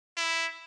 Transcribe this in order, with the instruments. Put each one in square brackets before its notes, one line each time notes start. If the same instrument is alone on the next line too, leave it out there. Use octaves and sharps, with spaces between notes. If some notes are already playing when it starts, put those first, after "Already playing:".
[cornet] E4